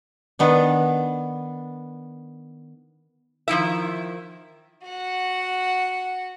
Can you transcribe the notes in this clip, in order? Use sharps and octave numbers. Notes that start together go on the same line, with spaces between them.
D#3 B3 D4
D#3 F3 E4 E5
F#4 F#5